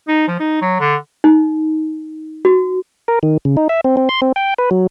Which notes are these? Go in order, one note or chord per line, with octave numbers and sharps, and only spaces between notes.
D#4
F3
D#4
F#3
D3
D#4
F#4
A#4
D#3
C#3
D#4
E5
C4
C4
C6
C4
G5
B4
F#3